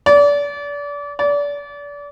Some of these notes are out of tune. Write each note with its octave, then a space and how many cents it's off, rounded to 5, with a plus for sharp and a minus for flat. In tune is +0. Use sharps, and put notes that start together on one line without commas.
D5 -30
D5 -30